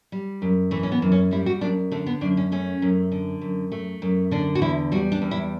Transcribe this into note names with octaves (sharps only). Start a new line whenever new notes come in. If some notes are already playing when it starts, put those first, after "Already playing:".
G3
F#2
E3 A3
C#4
B3
F#2
C#4
G3 E4
F#4
F#2 D4
D3 A3
B3
F#2 D4
C#4
A3 C#4
F#2
D3
F#2
A3
F#2
D3 D4
F#4
E2 E4
G3 F#4
D4
E2
E4